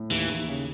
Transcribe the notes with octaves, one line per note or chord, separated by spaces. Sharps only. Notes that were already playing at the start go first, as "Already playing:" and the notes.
Already playing: A2
D#2 E3
D#2
C#3